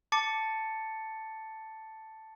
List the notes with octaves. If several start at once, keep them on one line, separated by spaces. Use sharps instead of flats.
A5 D6 A6 C#7